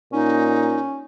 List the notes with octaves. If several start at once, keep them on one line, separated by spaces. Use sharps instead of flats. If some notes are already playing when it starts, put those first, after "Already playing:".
A#2 C#4 D#4